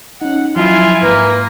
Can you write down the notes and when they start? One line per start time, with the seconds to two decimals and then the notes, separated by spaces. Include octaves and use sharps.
0.22 C#4 D#4 F#5
0.56 F3 F#3 E4 F4 G#5
1.02 G#2 A#3 B4